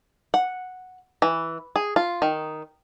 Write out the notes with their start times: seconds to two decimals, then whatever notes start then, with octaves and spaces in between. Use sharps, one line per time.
0.34 F#5
1.22 E3
1.76 G#4
1.96 F4
2.22 D#3